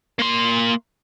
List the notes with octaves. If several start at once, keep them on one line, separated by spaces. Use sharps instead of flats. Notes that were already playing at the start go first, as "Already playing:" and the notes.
A#3 C6